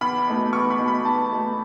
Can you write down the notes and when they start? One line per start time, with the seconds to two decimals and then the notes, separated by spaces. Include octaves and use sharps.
0.01 E2 B5
0.27 B2 A3 D#4
0.53 E2 C#6
0.71 B5
0.78 B2 A3 D#4
0.88 B5
1.05 E2 A5
1.30 B2 A3 D#4